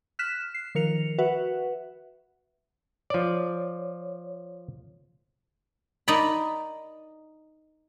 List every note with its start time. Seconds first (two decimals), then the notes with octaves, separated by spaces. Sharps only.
0.19 F6 F#6 B6 E7
0.54 C7
0.75 D#3 F3 A#4 C#7 F7
1.18 F#4 B4 E5 F#5
3.10 F3 C#5 D5
6.08 D#4 A#4 D5 B5